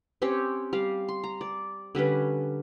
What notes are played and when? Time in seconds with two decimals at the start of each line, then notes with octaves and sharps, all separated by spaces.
0.22 C4 C#4 G4 C#5
0.73 G3 F5
1.08 C6
1.24 A#5
1.41 D5
1.95 D3 G3 C#4 B4